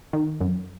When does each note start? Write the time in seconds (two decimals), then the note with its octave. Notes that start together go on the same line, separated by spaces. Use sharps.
0.13 D#3
0.41 F#2